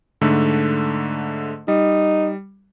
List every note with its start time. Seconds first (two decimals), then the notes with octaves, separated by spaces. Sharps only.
0.21 G#2 D3 A3
1.68 G3 D#4